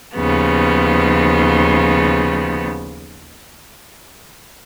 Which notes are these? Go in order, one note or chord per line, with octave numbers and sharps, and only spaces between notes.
D#2 C#3 F3 B3